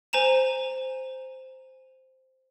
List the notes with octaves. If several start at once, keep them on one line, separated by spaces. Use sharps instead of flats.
C5 G#5 A#5 E7